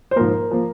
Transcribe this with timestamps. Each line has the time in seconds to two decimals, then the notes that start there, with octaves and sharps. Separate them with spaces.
0.11 C5
0.16 G#2 F3 A#3 A#4
0.51 F3 A#3